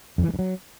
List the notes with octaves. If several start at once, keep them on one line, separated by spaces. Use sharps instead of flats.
F2
E3
G#3
G2
F#3